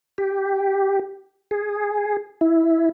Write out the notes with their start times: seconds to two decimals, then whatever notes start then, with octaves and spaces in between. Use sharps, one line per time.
0.18 G4
1.51 G#4
2.41 E4